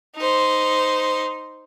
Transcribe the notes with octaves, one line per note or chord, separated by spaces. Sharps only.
D#4 C5